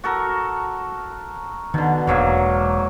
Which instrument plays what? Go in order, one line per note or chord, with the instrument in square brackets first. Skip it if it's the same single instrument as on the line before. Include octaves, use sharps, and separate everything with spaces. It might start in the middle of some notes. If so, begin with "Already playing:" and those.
[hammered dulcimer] F#4 A4 A#4
[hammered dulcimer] B2 D3 [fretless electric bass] D#3
[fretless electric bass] E1 [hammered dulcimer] G#2 F#3 A#3